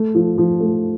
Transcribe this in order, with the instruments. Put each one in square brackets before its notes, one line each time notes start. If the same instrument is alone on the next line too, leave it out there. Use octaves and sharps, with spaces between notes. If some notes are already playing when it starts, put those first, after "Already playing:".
Already playing: [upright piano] A3
F3
F3
A3